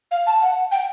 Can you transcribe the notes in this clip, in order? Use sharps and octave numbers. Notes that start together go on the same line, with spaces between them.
F5
A5
F#5
G5